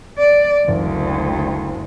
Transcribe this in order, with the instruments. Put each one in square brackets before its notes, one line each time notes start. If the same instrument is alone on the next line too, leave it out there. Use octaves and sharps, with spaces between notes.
[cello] D5
[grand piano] F#1 [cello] D2